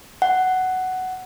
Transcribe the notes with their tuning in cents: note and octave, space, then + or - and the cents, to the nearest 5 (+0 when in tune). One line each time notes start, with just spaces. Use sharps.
F#5 +10